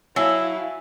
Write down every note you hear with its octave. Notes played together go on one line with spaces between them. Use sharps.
F#3 E4 E5 F5 G#5 A5